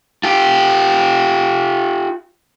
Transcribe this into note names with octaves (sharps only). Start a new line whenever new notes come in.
F4 G4